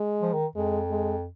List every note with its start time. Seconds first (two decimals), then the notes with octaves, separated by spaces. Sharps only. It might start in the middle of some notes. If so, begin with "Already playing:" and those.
Already playing: G#3
0.21 F3
0.33 D#3
0.56 F2 G#3
0.90 G#3